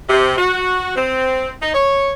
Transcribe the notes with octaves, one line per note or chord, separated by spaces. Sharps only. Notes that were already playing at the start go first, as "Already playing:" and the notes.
C3
F#4
C4
D#4
C#5